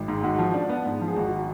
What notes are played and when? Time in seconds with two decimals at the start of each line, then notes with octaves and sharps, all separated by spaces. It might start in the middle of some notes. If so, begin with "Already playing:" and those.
Already playing: G#1
0.08 G#2
0.23 G#2 F#4
0.39 F3
0.54 D4
0.69 B3
0.86 G#2
1.01 F3
1.08 G#4
1.16 G#1 F#4